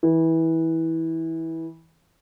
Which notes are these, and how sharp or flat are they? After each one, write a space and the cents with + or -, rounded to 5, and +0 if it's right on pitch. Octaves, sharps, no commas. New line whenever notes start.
E3 -20